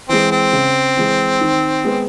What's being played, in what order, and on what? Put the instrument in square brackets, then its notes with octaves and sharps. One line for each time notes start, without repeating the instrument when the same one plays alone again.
[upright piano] E3 G#3 [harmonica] C4
[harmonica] C4
[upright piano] C#3
E3 G#3
D#3
G#3 B3